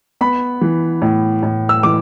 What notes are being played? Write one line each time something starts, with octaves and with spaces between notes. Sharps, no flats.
B3 B5
E3
A2
A2
E6
E3 D6